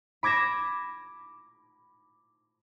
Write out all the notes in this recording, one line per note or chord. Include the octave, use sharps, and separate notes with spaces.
B5 D6 G#6 A#6 E7